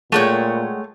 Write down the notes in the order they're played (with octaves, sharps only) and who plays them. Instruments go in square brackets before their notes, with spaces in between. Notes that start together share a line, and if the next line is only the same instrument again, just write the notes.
[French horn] A#2 [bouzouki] G#3 F#5 G5 [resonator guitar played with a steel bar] A3 C#5